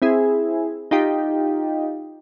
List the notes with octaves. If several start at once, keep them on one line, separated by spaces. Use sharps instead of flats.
C4 E4 G#4
D#4 F4 G4